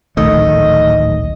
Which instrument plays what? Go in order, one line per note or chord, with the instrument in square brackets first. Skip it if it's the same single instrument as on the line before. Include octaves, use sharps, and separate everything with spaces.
[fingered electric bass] D1 A#1 D#3 [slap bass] A3 [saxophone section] D#5